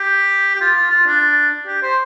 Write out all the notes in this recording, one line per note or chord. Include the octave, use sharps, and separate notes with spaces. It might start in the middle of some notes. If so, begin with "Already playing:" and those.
Already playing: G4
G4
F4
F4
F4
D4
G4
C5